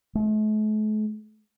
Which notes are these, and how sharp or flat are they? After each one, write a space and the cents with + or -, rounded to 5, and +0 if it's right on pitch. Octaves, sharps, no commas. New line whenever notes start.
A3 -45